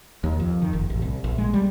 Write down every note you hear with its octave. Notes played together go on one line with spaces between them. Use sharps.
D#2
F2
D#3
F#1
A1
C2
A#1
G#3
G3